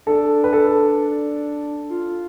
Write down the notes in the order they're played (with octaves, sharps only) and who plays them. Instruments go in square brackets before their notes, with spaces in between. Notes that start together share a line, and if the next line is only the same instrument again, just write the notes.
[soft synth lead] D4 [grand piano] A4
[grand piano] B4
A4
[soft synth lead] F4